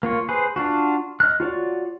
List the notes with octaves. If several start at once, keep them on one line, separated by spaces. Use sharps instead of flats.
A#3 F4 C#5
G#4 B4 C5
D4 F4 F#4
D#5 F6 F#6
F4 F#4 C#5 D5